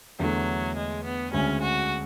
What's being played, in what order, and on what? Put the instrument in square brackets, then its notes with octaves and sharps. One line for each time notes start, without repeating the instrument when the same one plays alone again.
[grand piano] E2 D3 A3 [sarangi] F#3
[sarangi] G#3
B3
[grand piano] D2 C#3 G#3 [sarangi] C#4
[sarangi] F#4